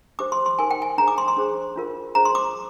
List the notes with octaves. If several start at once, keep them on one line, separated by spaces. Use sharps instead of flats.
D4 G4 C5 D6
C6
C6
D#4 A#4 G#5
G5
G#5
D4 G#4 C5 A#5
D6
C6
C6
D4 G#4 C5
D4 F4 A#4
D4 G#4 C5 A#5
C6
D6